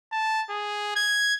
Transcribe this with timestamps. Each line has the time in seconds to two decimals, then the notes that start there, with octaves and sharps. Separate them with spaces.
0.12 A5
0.50 G#4
0.96 G#6